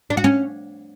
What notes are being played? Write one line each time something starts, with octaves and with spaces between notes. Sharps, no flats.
D4
F#4
C#4